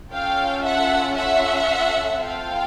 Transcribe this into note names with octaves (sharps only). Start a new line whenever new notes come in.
C#4 F4 A4 F5 G5
E5 F#5
E5 F#5
C4 F4 A4 F5 G5